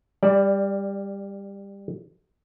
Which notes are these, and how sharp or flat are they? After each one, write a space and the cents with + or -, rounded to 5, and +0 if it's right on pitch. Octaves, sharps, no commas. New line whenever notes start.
G3 +20 D5 +0